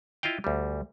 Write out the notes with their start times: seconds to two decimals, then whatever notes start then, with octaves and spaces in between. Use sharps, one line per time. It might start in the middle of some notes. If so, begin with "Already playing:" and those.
0.23 E4 F4 D#5 F5 G5
0.44 D2 G3